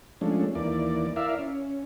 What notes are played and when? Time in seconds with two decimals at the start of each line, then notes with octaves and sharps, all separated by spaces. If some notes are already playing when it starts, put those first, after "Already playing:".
0.21 F3 G#3 A3 C#4 D4
0.55 D#2 E3 A#3 D5
1.16 E4 A#4 D5 E5 F5
1.39 C#4